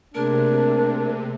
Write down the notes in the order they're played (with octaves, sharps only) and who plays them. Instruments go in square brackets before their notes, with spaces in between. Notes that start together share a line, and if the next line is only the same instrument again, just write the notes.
[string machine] C3 [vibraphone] A3 A#3 G#4 [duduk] D4 [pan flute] A#4